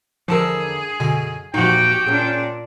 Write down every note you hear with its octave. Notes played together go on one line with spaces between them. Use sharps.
E2 D3 F3 G#4 A#4 A5 E6
F#2 B2 D3 G#5
E2 A#2 F3 D#4 F#4 G4 G5
A#2 C#4 D4 G#4